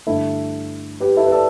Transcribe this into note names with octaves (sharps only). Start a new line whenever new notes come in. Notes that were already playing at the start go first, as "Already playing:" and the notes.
G2 D3 A3 E4 A4
G4 B4
E4 A4
B4
A4 D5